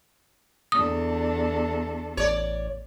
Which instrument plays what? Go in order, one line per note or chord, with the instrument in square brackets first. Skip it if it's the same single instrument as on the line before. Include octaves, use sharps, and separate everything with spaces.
[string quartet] E2 D4 A4 [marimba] D#6
[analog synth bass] A1 [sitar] C#5 D5